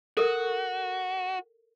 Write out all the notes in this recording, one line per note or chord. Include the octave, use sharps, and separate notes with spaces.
F#4 A4 A#4